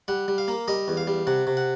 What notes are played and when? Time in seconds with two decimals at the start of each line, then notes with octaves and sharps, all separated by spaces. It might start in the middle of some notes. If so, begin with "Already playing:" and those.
0.08 G3 F#5
0.28 G3
0.38 F5
0.48 A#3
0.68 G3 D#5
0.88 E2
0.97 F5
1.07 G3
1.27 C3 F#5
1.47 C3
1.57 F#5